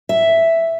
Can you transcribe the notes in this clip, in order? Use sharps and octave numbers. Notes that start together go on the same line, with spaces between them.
E5